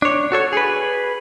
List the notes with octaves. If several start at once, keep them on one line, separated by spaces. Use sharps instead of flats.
D4 C#5
F#4 A4 C#5
G#4 B4